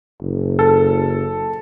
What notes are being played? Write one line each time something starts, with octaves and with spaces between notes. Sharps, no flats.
F#1
A4